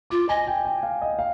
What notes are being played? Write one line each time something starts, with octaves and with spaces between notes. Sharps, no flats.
F4 D6
D#5 G#5
G5
G5
F5
D#5
F5